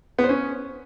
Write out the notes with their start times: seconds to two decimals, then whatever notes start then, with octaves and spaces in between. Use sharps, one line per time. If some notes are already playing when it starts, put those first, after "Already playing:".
0.19 B3
0.24 C5
0.29 C#4